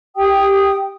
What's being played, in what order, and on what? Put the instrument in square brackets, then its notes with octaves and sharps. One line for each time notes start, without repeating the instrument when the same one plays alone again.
[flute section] G4 G5 D#6